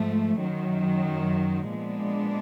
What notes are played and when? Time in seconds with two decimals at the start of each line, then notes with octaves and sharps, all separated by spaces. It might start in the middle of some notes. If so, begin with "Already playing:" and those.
Already playing: G#2 F3 A3
0.40 F#2 D#3 F#3
1.68 A#2 F3 G#3 B3 D4